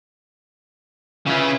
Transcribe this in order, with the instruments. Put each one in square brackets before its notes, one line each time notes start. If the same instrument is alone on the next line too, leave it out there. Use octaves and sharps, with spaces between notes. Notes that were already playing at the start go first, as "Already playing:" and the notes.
[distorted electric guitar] C#3 C#4 [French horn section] E3 E4 F4